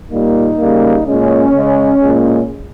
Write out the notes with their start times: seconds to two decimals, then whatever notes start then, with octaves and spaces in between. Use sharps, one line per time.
0.11 A#2 G3 A#3 D#4
0.59 C#3 G3 A#3
1.06 A#2 G#3 C#4
1.54 C#3 G#3
2.01 A#2 G#3